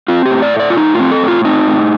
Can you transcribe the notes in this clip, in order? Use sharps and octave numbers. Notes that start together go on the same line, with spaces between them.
C4 F4
A2 G4
D5
A3
D5
F4
A2 D#4
F4
C4
A4
A2
F4
C4 D#4
A2